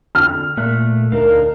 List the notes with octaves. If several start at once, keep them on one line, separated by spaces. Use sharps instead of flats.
D3 F6
A#2 A3 E5 F#6
D2 D4 D#4 A#4 F5